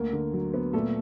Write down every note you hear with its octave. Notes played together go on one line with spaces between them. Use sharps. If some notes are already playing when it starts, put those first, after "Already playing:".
Already playing: D2 A#3 A#4
D3
F#3
B3
A#2 A3 A4